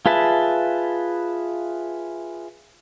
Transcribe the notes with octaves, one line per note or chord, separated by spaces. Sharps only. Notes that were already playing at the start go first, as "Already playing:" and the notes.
F4 G#4 B4 E5 A5